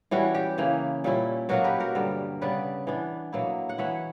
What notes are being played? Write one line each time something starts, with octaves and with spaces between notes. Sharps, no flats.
E3 G3 C#4 E4 F#4
G4
C#3 E3 A#3
A#2 G3 C#4 E4
B2 F#3 A#3 F#4 A#4
G4 B4
F#4 A#4
G2 D3 G3
C#3 G3 B3 B4 D5
E3 B3 D4
B2 F#3 A#3 E4
F#5
E3 B3 E4 C#5 E5